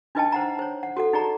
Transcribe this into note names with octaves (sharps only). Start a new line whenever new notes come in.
D4 D#4 B4 D#5 G5 A5
C5 F#5 A#5
C5 C#5
F#5
F#4 A4 F#5
D#4 G#4 D5 A#5